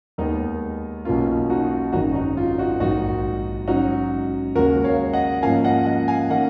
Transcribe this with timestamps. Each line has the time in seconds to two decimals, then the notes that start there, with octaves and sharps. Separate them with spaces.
0.18 D#2 D#3 G#3 B3 D#4
1.05 B1 B2 A#3 C#4 F4
1.50 D#4 F#4
1.92 G#1 F#2 D#3 G#3 D#4 F#4
2.15 D#4
2.37 F4
2.58 D#4 F#4
2.80 A#1 G#2 D#3 D#4 F#4
3.67 G#2 F#3 C#4 D#4 F#4
4.55 D#2 C#3 G#3 F#4 A#4
4.84 C#5 F5
5.13 D#5 F#5
5.42 G#2 F3 A#3 C#4 F5 G#5
5.64 D#5 F#5
5.86 D#5 F#5
6.08 F5 G#5
6.30 D#3 A#3 C#4 D#5 F#5